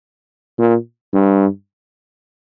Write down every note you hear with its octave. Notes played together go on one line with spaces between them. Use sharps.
A#2
G2